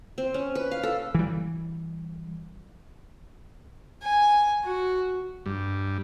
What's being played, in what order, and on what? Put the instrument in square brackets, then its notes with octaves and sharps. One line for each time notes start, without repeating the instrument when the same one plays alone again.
[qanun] C4
C#4
B4
F5
A4
[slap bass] E3 G3
[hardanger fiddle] G#5
F#4
[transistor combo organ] G2